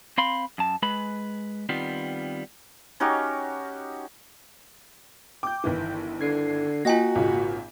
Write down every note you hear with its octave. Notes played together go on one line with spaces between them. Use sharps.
C4 F5 B5 C6
F#2 A5
G#3 B4 B5
D#3 G3 B3 C4 F4
C#4 D#4 F#4 G4
G5 D6 G6
G1 D#3 E3
D3 G#6 C7
A#3 F4 F#4 D#5 G5 G#5 A#6
G#1 A#2 C#3